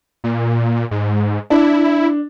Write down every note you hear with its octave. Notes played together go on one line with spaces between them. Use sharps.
A#2
G#2
D4 E4